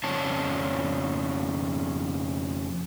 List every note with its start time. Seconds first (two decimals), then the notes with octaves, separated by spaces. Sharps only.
0.04 F2 C#3 C4 D4 C#5 A5